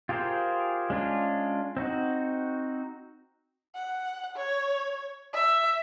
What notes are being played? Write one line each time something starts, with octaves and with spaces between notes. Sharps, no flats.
F4 G4 G#4 A#4 C5
G#3 C#4 D4 F4
C4 D#4 F#4
F#5
C#5
E5